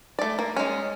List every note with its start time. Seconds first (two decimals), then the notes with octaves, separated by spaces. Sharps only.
0.19 A3 D5
0.39 A#3
0.56 G#3 C#4